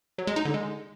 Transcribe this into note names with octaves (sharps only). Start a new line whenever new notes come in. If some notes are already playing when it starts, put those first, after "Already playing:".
F#3
G#3
D#4
D3
G#3